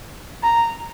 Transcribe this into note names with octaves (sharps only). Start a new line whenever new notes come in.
A#5